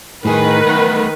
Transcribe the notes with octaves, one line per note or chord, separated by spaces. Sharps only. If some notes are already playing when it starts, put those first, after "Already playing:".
A2 D#3 G#4 B4
A3 B3